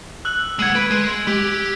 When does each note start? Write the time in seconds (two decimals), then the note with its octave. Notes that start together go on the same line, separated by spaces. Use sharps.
0.25 E6 F#6 F#7
0.59 G#3 F#5 G#6 F#7
0.75 B4 D7
0.91 G#3
1.27 G4